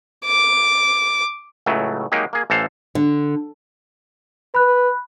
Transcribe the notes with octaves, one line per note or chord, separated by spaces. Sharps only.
D6
C#2 A2 C#3 F#3 A3
F#3 G#3 A#3 D#4 G4
A#3 G#4
A1 E3 A4 C5 F5
D3
B4 B5 F#6